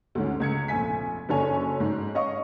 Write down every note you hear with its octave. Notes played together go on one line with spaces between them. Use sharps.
D2 G#2 C#4
C#2 G#6 C#7
F1 A#1 G#5 B6
F#1 F#2 D4 A4 C#5 G#5
G#2
C#5 D#5 F5 C#6